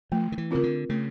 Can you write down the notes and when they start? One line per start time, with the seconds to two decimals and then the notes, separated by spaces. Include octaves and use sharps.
0.12 F3 A3
0.32 D#3
0.38 E3
0.51 C#3 C4 F4 A#4
0.63 D3
0.89 C#3 A3